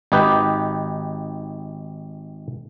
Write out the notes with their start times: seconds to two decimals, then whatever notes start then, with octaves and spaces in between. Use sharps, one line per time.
0.12 G#1 D#4 G4 B4